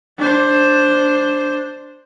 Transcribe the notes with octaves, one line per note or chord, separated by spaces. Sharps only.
D4 C5